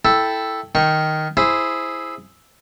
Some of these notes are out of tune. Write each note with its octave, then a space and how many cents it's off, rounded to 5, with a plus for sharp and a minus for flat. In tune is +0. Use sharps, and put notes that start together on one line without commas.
E4 +0 A4 +0 G5 -5
D#3 +0 G5 -15 C#6 -15
E4 +0 G#4 +0 C5 +0